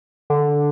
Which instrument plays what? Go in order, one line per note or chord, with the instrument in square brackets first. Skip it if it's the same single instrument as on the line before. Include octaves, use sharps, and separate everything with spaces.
[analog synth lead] D3